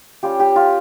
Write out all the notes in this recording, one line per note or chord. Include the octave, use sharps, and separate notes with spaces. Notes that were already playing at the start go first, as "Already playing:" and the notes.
G3 C#4 F4 G4
G4
F4